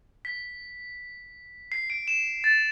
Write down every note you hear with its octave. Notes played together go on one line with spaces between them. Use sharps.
B6
C7
D7
E7
A6